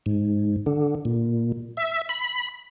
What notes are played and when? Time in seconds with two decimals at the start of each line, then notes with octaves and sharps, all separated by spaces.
0.06 G#2
0.66 D3
1.05 A#2
1.77 E5
2.09 B5